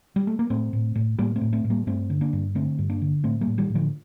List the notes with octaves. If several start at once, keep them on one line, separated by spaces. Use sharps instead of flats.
G3
A3
A#3
A2 A3 C4
A2
A2
A2 G3 A#3
A3 C4
A2
A3 C4
A2
G3 A#3
G2 A3 C4
D3
A#3 D4
G2
D3 A3 C4
G2
A#3 D4
D3
A2 A3 C4
G3 A#3
A2
D#3 G3
A2
D3 F3